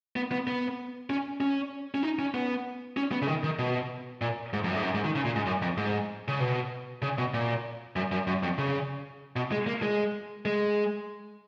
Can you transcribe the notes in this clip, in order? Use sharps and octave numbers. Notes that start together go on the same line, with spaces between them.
B3
B3
B3
C#4
C#4
C#4
D#4
C#4
B3
C#4
B3
C#3
D#3
D#3
B2
A#2
G#2
F2
F#2
G#2
F#2
G#2
D#3
C#3
A#2
G#2
F#2
F2
G#2
C#3
B2
C#3
B2
A#2
F#2
F#2
F#2
F2
C#3
B2
G#3
A#3
G#3
G#3